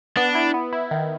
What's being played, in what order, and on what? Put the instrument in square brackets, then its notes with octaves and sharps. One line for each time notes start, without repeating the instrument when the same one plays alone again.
[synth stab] B3 [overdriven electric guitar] D4
[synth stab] E4
B3
E4
D#3